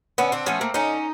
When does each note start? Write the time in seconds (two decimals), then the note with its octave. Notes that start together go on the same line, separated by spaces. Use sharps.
0.18 D3 B3 C#4
0.32 C4 D4
0.46 F3 A3 B3 C#4
0.61 A#3 C4
0.74 D3 C#4 D#4